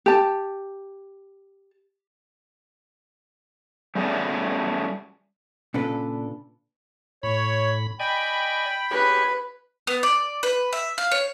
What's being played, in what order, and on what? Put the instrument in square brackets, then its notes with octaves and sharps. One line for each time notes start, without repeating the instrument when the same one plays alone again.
[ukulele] G4 A5
[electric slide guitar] G3 A3 B3 C#4 G#4 D5
[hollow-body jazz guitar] A#2 C#3 D4 A4 B4
[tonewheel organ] A2 B5 [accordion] C#5
[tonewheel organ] D5 D#5 G#5 [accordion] G5 B5
[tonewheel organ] G4 G#4 C#5 [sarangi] B4
[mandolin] B3
D5
B4
E5
F5
C#5